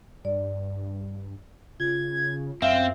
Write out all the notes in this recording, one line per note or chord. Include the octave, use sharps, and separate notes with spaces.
G2 D5
C#3 F4 G#6
F#2 C4 E5 F5